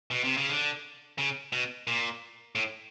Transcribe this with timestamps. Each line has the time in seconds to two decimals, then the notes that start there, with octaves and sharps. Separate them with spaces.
0.11 B2
0.24 C3
0.37 C#3
0.49 D3
1.18 C#3
1.53 B2
1.87 A#2
2.55 A2